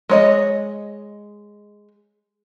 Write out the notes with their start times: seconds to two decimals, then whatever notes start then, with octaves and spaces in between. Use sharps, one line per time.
0.09 G#3 C#5 D#5